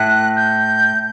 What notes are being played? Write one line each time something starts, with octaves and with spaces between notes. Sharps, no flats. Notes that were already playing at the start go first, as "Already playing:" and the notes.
Already playing: A2 F#6
G6